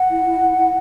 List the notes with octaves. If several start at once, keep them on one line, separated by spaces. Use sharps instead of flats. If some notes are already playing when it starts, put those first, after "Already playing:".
Already playing: F#5
E4
E4
E4
E4